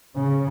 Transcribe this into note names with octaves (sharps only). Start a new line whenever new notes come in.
C#3